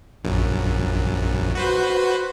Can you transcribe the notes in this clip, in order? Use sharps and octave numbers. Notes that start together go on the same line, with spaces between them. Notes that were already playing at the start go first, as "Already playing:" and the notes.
A#1 F#2
F#4 B4 C5